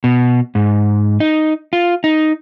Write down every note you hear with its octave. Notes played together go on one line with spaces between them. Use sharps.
B2
G#2
D#4
F4
D#4